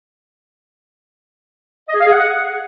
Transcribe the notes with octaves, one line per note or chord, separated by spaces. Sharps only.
D#5
G#4
F5
G#4
F#5